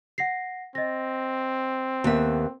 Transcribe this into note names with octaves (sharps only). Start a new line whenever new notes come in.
F#5 A#6 C7
C4 D#5 A#6
D#2 B3 E5